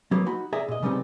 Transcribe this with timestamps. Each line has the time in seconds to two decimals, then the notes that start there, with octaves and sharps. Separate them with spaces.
0.11 F#3 A#3 B3
0.26 D#4 F#4 B5
0.53 G#4 D5 E5 A#5
0.68 A#2 D#5
0.83 C#3 G3 B3 C4 D#4